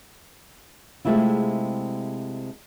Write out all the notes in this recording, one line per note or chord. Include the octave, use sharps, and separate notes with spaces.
C3 G#3 A3 C4 E4 F4